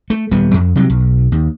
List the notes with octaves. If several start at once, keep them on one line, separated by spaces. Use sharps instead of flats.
A3
D#1 G3 B3
F2
C3 F#3 G3
B1
D#2